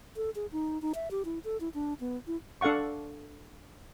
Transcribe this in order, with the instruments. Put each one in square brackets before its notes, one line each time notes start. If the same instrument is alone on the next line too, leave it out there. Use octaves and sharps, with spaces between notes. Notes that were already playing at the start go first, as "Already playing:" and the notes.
[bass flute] A4
G#4
D#4
D#4
E5
G4
E4
A4
E4
D4
B3
E4
[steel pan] D4 A4 F5 F#5 C#6